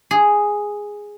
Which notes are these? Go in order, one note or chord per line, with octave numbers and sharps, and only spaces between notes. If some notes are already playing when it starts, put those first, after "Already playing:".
G#4